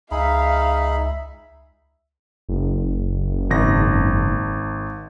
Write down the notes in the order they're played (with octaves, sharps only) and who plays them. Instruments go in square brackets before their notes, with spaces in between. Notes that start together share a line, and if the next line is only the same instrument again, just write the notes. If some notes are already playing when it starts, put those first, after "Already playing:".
[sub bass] C#2 [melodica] D#4 G#4 B5 [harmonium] E5 [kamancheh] F5
[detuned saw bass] F#1
[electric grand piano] G#1 A#6